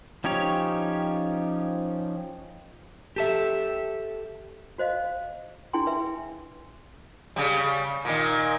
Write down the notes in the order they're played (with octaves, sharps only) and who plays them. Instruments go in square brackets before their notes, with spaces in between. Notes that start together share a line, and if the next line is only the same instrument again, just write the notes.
[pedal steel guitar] F3 C#4 D#4 G4 C#5
[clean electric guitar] G4 A4 E5
[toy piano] F#4 C5 D#5 F5
D4 E4 G#4 G5 G#5 C6
B4 E5
[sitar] C#3 G3
A#2 D#3